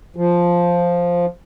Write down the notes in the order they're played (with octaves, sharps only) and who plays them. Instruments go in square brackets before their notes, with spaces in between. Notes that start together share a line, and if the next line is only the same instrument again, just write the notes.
[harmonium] F3